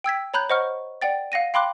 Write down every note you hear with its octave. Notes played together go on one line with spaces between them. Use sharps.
G5 E6 G#6 B6
C#5 A#5 B5 F#6 G6
C5 D#5 F#5 C#6 F6
D5 F#5 G5 A6
F5 F#5 A#6 D#7
F5 G5 B5 C6 D6 F#6